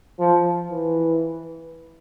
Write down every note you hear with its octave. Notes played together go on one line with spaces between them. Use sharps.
F3
E3